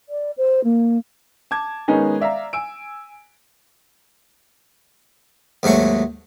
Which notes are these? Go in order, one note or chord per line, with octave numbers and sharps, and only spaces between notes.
D5
C5
A#3
A5 D6 G#6
D#3 G#3 B3 C#4 D#4 G#4
D5 E5 F5 A#5
G#5 E6 D7
D#2 G#2 F#3 A3 C#6